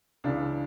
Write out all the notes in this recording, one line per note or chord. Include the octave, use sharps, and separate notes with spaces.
C#2 C#3 E3 D4